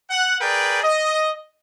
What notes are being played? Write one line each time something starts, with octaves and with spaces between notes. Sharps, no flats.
F#5
G#4 A#4 B4 D5 G5
D#5